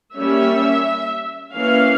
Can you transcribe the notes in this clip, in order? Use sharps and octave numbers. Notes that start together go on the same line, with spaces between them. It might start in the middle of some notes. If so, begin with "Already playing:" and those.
G3 A#3 C#4 E5
E3 A#3 C#4 F5